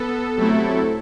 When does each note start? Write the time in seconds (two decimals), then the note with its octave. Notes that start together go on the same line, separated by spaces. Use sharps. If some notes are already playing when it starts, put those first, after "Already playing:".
Already playing: B3 A4
0.36 C3 F#3 A3 E4